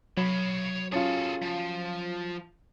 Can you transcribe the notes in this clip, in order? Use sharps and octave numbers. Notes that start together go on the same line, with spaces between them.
F#3 C#5 B5
C#4 F4 G#4 A4
F3